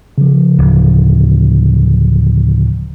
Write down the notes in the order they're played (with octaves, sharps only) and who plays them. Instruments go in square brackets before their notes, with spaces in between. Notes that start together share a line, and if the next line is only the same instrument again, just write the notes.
[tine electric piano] C#3 F3
[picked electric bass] D1